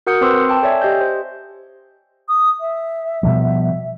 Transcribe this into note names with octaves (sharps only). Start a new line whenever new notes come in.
F#4 A#4 F#5 D#6 G6 C#7
C4 B4 C5 C6 D6 E6
G5 A5 D6
A4 C#5 D5 E5 G5 G#5
G4 D#5 G6
C5
D#6
E5
B2 F3 G3